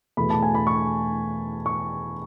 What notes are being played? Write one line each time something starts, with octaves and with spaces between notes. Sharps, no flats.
E2 B2 A3 B5
A5
G#5
B5
C#6
C#6